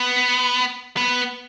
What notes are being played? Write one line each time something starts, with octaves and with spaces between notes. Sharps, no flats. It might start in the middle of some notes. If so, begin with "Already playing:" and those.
Already playing: B3
B3